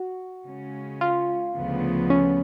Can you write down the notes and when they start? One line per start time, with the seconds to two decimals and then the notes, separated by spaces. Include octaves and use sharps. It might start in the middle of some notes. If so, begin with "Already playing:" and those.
Already playing: F#4
0.46 C#3 G#3 C#4
1.01 F4
1.56 D2 C#3 F3 B3
2.10 C#4